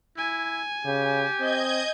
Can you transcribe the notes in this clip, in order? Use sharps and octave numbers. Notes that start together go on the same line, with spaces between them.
E4 G#5
C#3 G4
C4 D#5 G6 G#6